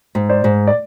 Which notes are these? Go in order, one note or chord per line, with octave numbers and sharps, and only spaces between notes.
G#2
C5 D5
G#2
D5